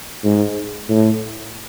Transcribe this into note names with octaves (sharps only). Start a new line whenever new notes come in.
G#2
A2